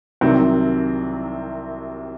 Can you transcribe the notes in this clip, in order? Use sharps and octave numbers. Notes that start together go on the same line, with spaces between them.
C2 C3 D#3 F#3 C4